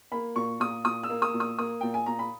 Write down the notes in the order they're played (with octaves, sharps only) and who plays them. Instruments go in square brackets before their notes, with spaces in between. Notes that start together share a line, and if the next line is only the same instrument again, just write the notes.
[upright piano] A#3 B5
A#2 C#6
A#2 D#6
A#2 D#6
E6
A#3
D#6
A#2
D#6
A#3 D#6
A#2 G5
G#5
A#2 A#5
B5